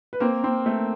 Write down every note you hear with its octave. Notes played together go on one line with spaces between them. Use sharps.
B4
A#3 C4 A#4
C4
A3